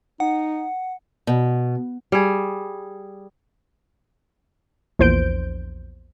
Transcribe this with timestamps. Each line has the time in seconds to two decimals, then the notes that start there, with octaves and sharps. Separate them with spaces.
0.20 D#4 F#5
1.27 B2
2.12 G3 G#4
4.99 A#1 E2 C5 G6 D7